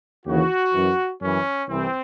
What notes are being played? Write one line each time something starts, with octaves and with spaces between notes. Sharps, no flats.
D#2 C#3 E3 F#4
F#2 E3
F#2 E3 C#4
C2 C3 E3 C4